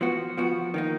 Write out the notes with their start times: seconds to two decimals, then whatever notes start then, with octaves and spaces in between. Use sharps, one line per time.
0.01 F3 B3 F#4
0.37 F3 B3 F#4
0.74 D#3 A#3 D#4